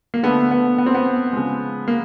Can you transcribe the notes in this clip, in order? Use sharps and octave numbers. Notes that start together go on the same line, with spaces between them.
A#3
D3 F3 A3 B3
B3
B3
C4
B3
C#3 F3 G#3
A#3